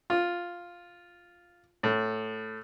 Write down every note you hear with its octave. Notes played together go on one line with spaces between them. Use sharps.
F4
A2